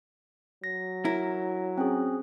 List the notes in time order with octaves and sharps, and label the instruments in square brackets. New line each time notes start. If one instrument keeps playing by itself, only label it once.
[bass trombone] F#3 [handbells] A#6
[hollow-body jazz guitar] E4 A#4
[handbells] C4 C#4 G#4